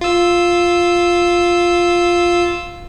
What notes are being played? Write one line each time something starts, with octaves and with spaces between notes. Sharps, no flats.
F4 E6